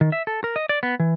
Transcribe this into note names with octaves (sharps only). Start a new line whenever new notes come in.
D#3
E5
A4
A#4
D#5
D5
B3
E3